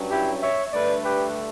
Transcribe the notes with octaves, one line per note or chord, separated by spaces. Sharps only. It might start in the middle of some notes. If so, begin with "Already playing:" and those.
Already playing: G2 F#3 C#4
E4 G4
C#5 E5
G2 D3 A3 D4 B4 D5
G4 B4